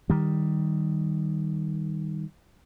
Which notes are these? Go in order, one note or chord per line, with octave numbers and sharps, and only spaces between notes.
D#3 G3